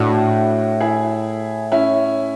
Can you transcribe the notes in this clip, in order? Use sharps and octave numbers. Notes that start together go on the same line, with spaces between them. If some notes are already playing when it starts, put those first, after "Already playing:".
Already playing: A2 D4 F#4
E4 G#4
C#4 E4